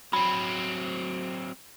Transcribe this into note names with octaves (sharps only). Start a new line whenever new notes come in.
F#3 C4 B5